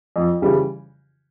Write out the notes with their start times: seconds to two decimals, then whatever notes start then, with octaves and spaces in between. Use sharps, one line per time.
0.16 F2
0.42 C#3 E3 G3